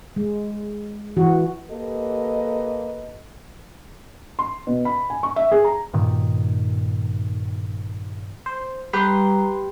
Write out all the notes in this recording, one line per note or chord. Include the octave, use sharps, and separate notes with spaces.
G#3
E3 F#4
A#3 G4 A4 B4 D#5
C6
B2
B5
G#5
C#6
E5
G#4
A#5
G2 A#2 D#3
C5
G3 G4 B4 A#5 C6